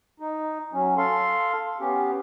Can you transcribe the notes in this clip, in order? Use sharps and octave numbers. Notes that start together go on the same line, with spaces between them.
D#4
F#3 C#4
A4 F5 C6
B3 C#4 G4